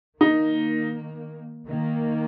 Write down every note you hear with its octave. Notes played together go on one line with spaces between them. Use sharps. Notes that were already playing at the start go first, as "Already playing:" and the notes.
D#3 A#3 D#4
D#3 A#3